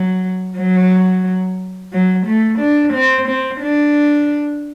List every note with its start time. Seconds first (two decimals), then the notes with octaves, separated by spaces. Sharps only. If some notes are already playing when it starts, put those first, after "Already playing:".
Already playing: F#3
0.57 F#3
1.92 F#3
2.26 A3
2.60 D4
2.93 C4
3.27 C4
3.61 D4